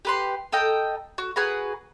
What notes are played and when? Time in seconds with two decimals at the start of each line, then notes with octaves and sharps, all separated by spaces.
0.05 G4 B4 C6
0.52 A4 D#5 G5 A#5
1.18 F#4
1.36 F#4 G#4 B4 A#5